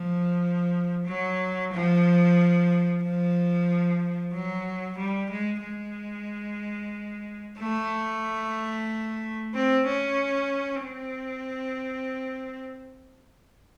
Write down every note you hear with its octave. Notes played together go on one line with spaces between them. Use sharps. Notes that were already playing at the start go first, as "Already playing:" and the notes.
Already playing: F3
F#3
F3
F3
F#3
G3
G#3
G#3
A3
C4
C#4
C4